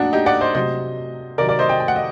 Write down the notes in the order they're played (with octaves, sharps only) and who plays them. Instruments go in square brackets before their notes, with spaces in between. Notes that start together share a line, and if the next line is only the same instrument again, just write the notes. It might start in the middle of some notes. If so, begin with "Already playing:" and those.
Already playing: [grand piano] A#2 F#3 D4 D#4 F#4
D#4 G4
D5 F#5
C5 D#5
C3 F#3 C5 D#5
C3 D#3 F#3 A#4 D5
A#4 D5
C5 D#5
D#5 G5
G5
F#5
D#5